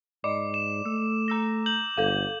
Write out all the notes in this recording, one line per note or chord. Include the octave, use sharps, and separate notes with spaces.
G#2 D5 D#5 D6
E7
A3 E6
A#5 E6 A#6
G6 F#7
G1 A4 F5